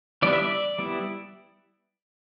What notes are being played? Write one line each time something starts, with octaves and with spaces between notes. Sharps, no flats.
E3 G3 B3 D4 D5
E5
D5
G3 B3 E4